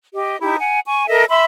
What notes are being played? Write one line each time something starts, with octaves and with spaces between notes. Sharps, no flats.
G4 D#5
D#4 E4 G4
F#5 G#5
G#5 C#6
A4 A#4 D#5 E5
E5 B5 C6 E6